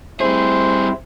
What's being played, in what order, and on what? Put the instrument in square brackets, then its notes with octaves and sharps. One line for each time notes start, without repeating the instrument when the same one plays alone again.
[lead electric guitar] G3 G#4 [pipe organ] C4 E4 [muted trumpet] C5